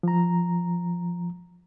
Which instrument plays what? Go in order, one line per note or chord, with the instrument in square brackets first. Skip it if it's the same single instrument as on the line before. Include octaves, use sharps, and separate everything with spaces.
[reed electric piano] F3 A#5